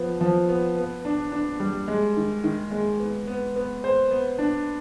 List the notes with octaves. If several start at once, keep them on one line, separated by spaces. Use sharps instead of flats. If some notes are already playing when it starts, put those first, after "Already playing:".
Already playing: F3 B3
F3
B3
B3
D4
D4
G3
G#3
D#3
D#3
G#3
B3
B3
B3
C5
B3
D4